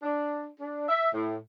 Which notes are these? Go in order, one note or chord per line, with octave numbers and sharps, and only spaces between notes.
D4
D4
E5
A2